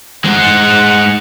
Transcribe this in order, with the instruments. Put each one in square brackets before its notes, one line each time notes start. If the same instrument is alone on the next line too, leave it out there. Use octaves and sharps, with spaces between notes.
[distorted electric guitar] E2 G#2 [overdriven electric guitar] G#3 C5 [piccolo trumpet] F#5